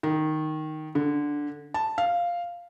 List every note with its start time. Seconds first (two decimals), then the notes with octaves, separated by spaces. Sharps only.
0.03 D#3
0.95 D3
1.74 A5
1.98 F5